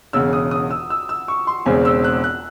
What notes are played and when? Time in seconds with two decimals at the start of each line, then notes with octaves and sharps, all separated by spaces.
0.13 E1 E2 C#3 E6
0.33 D#6
0.51 D#6
0.71 E6
0.90 E6
1.09 E6
1.28 C#6
1.47 C6
1.66 E1 E2 C#3 G#3 C4 G#5
1.85 E6
2.04 F#6
2.24 F#6